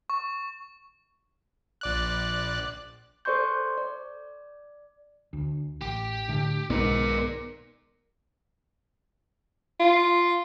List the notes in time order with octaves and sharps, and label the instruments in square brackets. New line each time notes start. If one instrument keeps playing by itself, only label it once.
[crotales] C#6
[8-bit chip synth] A#1 D5 F#6
[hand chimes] A4 C5 D5 C6 C#6 G6
D5
[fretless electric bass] D2
[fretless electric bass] A1 [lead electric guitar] G4
[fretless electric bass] A2 D3 A3
[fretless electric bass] B1 B2 [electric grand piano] G#2 D#3 [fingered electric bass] B3 [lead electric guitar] A#4 D5
[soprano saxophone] F4